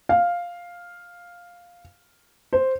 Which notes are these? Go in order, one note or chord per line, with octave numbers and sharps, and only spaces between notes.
F5
C5